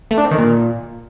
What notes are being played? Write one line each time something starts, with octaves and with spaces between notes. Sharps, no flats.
A3
D4
C4
D#3
A#2